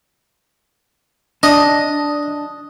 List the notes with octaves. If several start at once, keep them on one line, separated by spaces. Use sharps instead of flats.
D4 D#5